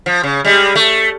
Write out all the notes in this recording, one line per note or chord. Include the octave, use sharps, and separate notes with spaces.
F3
C#3
G3 G#3
A3